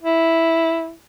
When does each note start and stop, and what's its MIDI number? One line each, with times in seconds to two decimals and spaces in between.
0.02 0.92 64